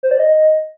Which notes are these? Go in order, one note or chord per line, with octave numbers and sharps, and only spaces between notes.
C5
D5
D#5